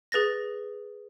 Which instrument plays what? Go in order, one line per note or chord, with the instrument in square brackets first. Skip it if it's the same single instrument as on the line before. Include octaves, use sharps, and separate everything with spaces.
[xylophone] G#4 B4 A6 A#6